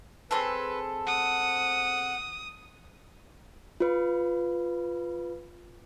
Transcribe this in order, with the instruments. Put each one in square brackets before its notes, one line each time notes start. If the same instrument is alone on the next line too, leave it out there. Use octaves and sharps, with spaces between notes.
[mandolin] C4 G#4 A4 [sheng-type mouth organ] B4
[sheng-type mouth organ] F#5 [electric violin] D#6
[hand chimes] F4 B4